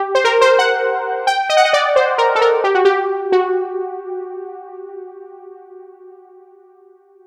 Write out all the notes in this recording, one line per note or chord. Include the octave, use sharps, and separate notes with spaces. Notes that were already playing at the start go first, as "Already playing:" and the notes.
Already playing: G4
C5
A#4
C5
F#5
G5
D#5
F#5
D#5
D5
C5
A#4
A4
A#4
G4
F#4
G4
F#4